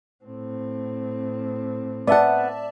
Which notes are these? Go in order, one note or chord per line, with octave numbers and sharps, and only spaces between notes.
A2 C4
B3 D5 E5 F#5 A5